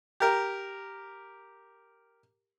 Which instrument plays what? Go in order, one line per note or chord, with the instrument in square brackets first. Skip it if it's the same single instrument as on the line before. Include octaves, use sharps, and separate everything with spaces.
[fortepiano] G4 A#4